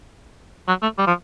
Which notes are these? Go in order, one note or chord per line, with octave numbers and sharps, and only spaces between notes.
F#3
A3
G3
F3